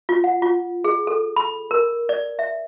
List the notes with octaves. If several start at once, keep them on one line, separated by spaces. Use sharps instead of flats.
F4
F#5
F4
G#4
A4
B5
A#4
D5
E5